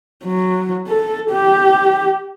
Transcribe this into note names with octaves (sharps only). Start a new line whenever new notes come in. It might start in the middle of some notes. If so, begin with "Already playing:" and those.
F#3
A4
G4